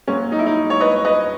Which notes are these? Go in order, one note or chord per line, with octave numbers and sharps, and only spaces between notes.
A#2 F#3 C#4
D#4
E4
D#4
C#5
B4 D#5
B4 D#5